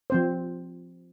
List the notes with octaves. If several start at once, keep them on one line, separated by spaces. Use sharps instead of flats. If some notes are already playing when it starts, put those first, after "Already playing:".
F3 C4 C5